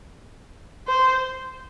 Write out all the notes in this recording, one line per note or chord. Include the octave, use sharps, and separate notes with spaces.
C5